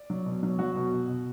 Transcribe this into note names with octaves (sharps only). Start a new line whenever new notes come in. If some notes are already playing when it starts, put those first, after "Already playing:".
Already playing: D5
F#3
B2
F#3
F#3 F#4
B2
B2
B2